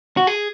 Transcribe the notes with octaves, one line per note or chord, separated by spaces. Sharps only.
F#4
G#4